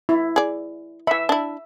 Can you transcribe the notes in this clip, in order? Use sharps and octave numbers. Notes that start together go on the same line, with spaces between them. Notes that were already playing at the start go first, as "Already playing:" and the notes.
E4
G#4 D5
E3 E5 B5
D4 E4